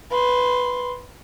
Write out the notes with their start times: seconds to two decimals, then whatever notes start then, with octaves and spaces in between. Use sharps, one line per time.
0.11 B4 C6